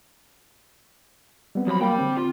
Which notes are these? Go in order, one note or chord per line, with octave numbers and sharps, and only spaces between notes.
G3 B3 C4
C#2 F3 F#3 B5
G3 A#3 D5 G5
D3 C4
F4